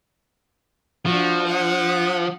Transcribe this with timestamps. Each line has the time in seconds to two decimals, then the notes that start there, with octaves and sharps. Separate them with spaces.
1.06 F3 D4 F#4
1.47 F#5